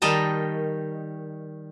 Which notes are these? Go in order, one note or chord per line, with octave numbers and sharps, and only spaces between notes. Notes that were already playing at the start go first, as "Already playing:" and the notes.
D#3 G3 D#5 A5 A#5